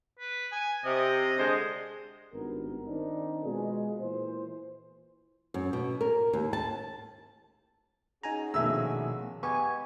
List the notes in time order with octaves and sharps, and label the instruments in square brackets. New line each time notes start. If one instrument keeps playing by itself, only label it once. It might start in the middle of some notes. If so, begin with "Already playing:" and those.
[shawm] B4
G#5
[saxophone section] C3 [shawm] D#5
[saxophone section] D3 G#3 C5
[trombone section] G#1 G2 B3 A#4
D#3 C4 D4 D#4
B2 G#3 F4 G#4
A#2 E3 C5
[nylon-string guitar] F#2
B2
A#4
D#2
A5
[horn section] C#4 F#4 G#4 [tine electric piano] D#4 G#5 A#5
[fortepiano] A#1 E5 E6 [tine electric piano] B2 D#3 A3
[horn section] G#3 G4 G#5 [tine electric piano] B3 [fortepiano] C#6